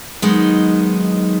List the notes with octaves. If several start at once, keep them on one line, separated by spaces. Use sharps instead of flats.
D#3 F#3 G#3 B3 D#4